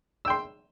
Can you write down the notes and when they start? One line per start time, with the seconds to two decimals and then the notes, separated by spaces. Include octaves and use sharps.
0.25 E6
0.28 G5
0.30 C6